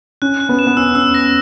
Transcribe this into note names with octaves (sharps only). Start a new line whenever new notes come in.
C#4 F#6
F#6
B3
E7
B3
C#4 E6
C#4 E6
A#6